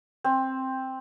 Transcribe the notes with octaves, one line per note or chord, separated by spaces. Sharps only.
C4